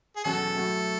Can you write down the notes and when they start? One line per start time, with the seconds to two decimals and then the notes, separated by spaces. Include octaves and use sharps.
0.17 G#4
0.24 E2 B2 F#3 C#4 F#4 A4
0.55 A2 F#3 A3